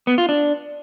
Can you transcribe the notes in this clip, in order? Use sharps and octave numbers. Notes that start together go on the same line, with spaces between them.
B3
F4
D4